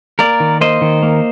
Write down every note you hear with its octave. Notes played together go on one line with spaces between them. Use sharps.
A#3 A#4 D5
D#3
A#3 C5 D#5
D#3
A#3